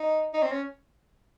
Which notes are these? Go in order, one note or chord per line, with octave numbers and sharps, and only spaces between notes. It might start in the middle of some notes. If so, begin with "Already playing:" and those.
Already playing: D#4
D#4
C4
C#4